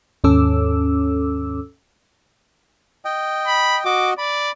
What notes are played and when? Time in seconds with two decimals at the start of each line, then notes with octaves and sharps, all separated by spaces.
0.24 D#2 G#2 C#4 A4 D6 E6
3.05 D#5 G5
3.47 B5
3.85 F#4 D#5 D6
4.18 D5 B5